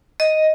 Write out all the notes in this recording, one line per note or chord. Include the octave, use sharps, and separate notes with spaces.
D#5